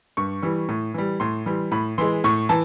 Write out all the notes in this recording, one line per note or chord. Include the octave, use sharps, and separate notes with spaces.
G2 C#6
E3 G3
A2
E3 G3
A2 C6
E3 G3
A2 B5
E3 G#3 C6
A2 C#6
E3 A5